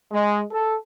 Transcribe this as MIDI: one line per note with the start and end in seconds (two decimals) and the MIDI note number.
0.12 0.42 56
0.52 0.74 69